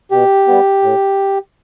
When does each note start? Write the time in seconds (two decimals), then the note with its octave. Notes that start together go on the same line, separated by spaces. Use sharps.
0.11 B2 G4
0.48 G3 B3
0.82 A2